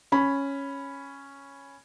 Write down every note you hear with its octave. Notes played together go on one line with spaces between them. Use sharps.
C#4 B5